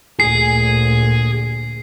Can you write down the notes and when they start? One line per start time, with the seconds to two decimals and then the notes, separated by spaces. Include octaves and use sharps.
0.20 D2 A#2 G#4 C7